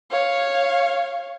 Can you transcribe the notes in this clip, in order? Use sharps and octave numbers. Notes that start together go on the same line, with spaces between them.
C#5 F5